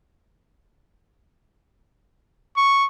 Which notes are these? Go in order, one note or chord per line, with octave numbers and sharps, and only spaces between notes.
C#6